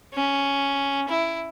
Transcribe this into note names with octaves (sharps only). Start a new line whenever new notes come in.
C#4
E4